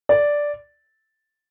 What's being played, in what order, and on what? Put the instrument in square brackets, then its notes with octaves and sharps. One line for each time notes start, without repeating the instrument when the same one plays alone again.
[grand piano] D5